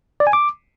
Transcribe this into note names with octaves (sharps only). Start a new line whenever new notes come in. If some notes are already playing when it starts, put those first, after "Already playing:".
D5
G#5
D6